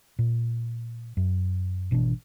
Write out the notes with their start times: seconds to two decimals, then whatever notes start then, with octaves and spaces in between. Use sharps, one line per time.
0.19 A#2
1.17 F#2
1.91 G#1 B2 E3 D4